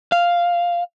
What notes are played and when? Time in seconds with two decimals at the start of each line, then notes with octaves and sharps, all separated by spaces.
0.12 F5